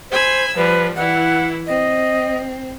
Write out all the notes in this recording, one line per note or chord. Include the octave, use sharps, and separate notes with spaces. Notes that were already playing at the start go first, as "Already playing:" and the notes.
C5 G#5 B5 E6
F3 G3 B4
E3 E4 F#5
C4 D#5